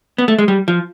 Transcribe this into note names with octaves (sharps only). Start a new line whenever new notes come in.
B3
A3
G#3
G3
F3